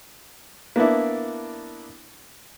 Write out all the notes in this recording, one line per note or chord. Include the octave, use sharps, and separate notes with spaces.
A#3 B3 D4 E4